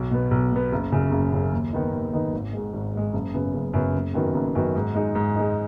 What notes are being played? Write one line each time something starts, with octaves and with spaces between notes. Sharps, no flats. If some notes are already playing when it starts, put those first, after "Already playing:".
Already playing: B1
B2 B3
B1
B2 B3
F#1
F#2 C#3
F#1
F#2 C#3
D#2
D#3 B3 D#4
D#2
D#3 B3 D#4
G#1
G#2 G#3
G#1
G#2 G#3
F#1
F#2 C#3 B3
F#1
F#2 C#3 B3
F#1
F#2 D#3 B3 F#4
F#1
F#2 D#3 B3 F#4
G#2
G#3 D#4
G#2
G#3 D#4